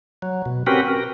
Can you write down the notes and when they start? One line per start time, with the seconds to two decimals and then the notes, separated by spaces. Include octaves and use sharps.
0.22 F#3
0.46 B2
0.67 C4 C#4 F#4 G4 A#4 B4
0.88 A#4